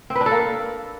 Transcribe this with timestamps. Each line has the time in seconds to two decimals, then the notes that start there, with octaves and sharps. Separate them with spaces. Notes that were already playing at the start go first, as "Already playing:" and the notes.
0.10 C4
0.15 B4
0.21 D4
0.26 A4
0.31 A#3